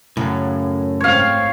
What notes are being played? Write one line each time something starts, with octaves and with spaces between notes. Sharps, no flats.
F#2 A2 C#3
G#2 C4 C#5 F5